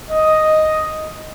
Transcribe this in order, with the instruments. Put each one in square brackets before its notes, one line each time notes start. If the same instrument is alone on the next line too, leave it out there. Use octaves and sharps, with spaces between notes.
[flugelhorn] D#5